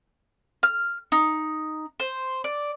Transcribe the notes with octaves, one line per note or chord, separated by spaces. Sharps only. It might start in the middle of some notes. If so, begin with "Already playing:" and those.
F6
D#4
C5
D5